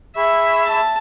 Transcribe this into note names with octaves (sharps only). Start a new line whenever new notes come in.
G#4 E5 B5 C#6
A5